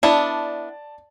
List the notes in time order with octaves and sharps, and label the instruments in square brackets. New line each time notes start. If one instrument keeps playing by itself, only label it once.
[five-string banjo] B3 D4 E4 [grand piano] D5 A5